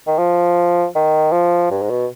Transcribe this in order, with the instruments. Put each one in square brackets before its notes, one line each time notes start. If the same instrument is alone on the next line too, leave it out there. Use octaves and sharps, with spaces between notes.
[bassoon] D#3
F3
D#3
F3
G2
G#2
B2